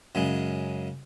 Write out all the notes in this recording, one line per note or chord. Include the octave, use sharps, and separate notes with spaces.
F#2 C#3 G#3